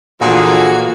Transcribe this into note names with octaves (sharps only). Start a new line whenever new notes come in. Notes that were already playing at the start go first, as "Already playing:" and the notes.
A#2 D3 E3 F3 A#3 F4 F#4 G#4